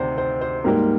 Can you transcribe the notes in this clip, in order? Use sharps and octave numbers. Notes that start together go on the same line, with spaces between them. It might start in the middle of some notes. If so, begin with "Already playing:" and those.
Already playing: D2 C3 D#3 C5 D5
C5
C5
G#2 G3 A#3 A#4